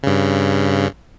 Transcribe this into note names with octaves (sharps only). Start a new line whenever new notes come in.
G2 C#3